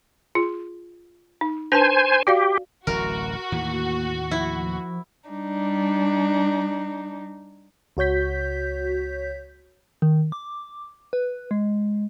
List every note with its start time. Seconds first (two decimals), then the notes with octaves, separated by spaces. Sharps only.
0.35 F4 G#4
1.41 D#4
1.72 D4 B4 C5 G#5 A5
2.27 F#4 G4 D5 F5
2.87 D1 A1 F#3 F#4 A#4
3.52 D#2 A2 E3 A#3
4.31 F3 E4
5.28 G3 D4 D#4
7.97 C#2 F#4 C#5 G6 B6
10.02 D#3
10.32 D6
11.13 B4
11.51 G#3